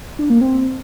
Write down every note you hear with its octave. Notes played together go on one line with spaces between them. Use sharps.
D4
A#3
C4